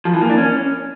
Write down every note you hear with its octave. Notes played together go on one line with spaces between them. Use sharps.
F3
E3
A#3
D4
C#4